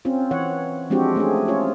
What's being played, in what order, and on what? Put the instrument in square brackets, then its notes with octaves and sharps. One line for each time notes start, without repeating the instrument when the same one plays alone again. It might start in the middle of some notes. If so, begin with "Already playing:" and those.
[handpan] C4 C#4 F4
E3 C#5 F#5
F3 G#3 C4 D4 F#4 G4
A3 C#4 D4 G#4
C#4 F4 C#5